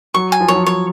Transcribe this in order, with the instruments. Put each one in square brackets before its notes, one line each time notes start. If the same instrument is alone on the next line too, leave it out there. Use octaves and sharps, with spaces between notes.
[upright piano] F#3 [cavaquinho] C#6
[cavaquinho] G#5
[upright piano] F3
[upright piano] F#3 [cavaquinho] C#5
[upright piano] F3
[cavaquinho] C#5